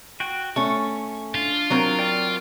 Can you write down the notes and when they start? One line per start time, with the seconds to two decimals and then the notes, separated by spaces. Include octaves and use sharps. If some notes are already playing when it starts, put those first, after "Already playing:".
0.20 F#4 G5
0.56 A3 C#4 C#6
1.35 D4 F4
1.70 F#3 C4 A#4
1.99 D5 G5